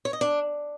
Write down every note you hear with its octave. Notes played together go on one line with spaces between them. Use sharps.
C#5
D#5
D4